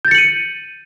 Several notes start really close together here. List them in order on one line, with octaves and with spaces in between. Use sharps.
G6 A6 C#7 F#7 D#7